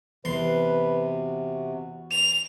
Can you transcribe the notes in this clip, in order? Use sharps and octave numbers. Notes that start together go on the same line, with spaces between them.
E2 C3 B4 C6
F#4
F7